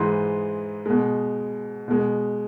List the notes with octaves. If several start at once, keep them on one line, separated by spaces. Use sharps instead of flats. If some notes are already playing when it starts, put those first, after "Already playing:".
Already playing: G#2 E3 G#3 C6
B2 G#3
B2 G#3